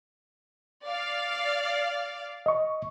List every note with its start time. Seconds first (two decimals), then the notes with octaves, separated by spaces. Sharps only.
0.85 D5 F5
2.46 D#5 C#6